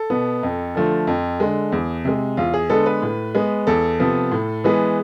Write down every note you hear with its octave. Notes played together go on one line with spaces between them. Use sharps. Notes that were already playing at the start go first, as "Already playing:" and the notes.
Already playing: A4
B2 B3
F2
D3 F3 A3
F2
D3 G#3
E2
C3 G#3
E2 F4
G#4
D3 G#3 B3 A4
B4
A2
G#3 B3
E2 A4
C3 F3 B3
A2
E3 G#3 B3